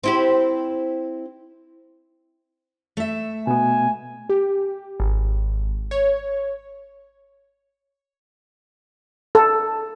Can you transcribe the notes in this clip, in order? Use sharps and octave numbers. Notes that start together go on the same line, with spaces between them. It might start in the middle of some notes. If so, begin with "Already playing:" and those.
C4 E4 G4
A3 E5
B2 B3 G#5
G4
G#1
C#5
A4